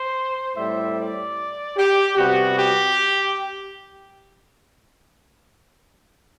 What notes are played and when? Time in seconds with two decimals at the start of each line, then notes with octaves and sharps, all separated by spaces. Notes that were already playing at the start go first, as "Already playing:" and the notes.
Already playing: C5
0.57 A2 G3 C4 E5
0.97 D5
1.77 G4
2.17 C3 G3 B3 F#4
2.57 G4